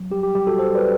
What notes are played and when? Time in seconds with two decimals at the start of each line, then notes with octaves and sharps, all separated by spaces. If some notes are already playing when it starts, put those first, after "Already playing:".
Already playing: F#3
0.11 G3 G4
0.23 G4
0.35 G3 G4
0.47 F#4 A4
0.59 G3 A4 C5
0.75 B4 D5